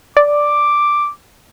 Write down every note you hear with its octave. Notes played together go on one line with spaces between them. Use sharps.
D5 D6